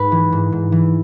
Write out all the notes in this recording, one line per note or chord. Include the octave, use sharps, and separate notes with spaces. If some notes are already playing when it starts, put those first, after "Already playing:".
Already playing: G#2 B4
E3
G#2
G#2
E3